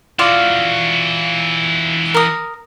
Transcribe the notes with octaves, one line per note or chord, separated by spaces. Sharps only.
E3 F4 F#4 D5 F5
A#4 D#6